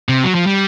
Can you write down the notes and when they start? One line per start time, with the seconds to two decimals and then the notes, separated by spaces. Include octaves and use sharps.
0.09 C3
0.24 F#3
0.35 F3
0.47 G3